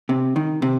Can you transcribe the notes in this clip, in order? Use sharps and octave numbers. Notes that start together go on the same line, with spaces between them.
C3
D#3
C3